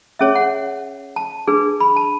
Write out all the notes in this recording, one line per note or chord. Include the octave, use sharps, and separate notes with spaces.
C#4 G#4 C#5 E5
F#5
A5
D4 G#4 B4
B5
A5